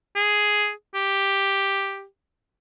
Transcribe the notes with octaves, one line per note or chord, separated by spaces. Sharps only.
G#4
G4